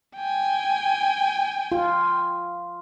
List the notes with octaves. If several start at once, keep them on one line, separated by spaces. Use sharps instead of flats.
G5 G#5
F4